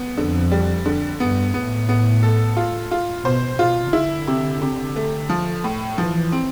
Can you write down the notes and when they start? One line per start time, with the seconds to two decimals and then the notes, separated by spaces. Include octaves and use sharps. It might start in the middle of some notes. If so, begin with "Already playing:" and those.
Already playing: B3
0.17 F2 D3
0.51 G3
0.86 D3
1.20 G2 B3
1.54 A2 B3
1.89 B3
2.23 A4
2.57 F4
2.91 F4
3.25 B2 C5
3.59 B2 F4
3.93 D3 E4
4.27 C3
4.62 C3
4.96 A3
5.30 F3
5.64 A2
5.98 E3 F3
6.32 C4